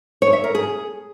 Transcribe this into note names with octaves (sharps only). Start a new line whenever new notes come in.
C#5
E5
A#4
G#4